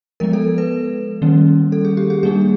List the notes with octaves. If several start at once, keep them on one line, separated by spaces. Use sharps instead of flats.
F3 G#3 B3 A#4
A4
B4
D#3 G3 A#3 C#4
A4
G#4
G4
G#4
G3 A#3 D4 G#4